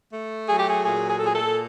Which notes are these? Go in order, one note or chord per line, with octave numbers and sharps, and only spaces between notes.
A3
F#3 G#4
G4
G#4
A#2 G#4
G#4
A4
A#2 G#4
A4